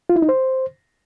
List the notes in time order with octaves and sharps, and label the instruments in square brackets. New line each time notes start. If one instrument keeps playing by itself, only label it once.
[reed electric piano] F4
E4
D#4
C5